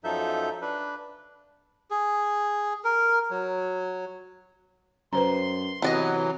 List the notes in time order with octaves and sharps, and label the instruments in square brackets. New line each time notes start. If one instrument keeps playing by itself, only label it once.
[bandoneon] F#2 F3 D#4 A4 E5 G6
D4 B4
[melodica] G#4
A#4
F#3
[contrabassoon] F#2 [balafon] B4 C5 A#5 [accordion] C6
[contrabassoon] C3 [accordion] E3 F#3 [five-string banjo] B3 D5 D#5